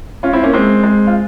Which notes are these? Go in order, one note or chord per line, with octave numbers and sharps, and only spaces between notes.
C#4 F4
C4 E4
A#3 C#4
G#3 C4
G#3 C4
F4